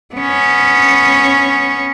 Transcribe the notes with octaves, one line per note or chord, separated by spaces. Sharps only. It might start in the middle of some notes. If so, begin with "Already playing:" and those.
B3 C#4